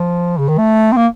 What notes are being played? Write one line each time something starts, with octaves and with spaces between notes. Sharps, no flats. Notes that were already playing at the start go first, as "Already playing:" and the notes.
Already playing: F3
C#3
D#3
A3
C4
A#3